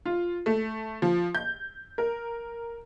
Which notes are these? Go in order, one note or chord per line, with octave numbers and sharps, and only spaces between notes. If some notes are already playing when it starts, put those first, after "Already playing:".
F4
A3
F3
G6
A#4